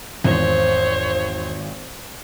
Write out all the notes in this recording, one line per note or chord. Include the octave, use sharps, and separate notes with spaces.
G#1 E2 F3 C5 C#5